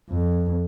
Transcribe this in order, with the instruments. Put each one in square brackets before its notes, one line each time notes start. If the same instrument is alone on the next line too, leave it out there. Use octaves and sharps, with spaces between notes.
[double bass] F2